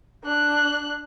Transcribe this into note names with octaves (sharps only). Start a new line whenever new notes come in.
D4 F#6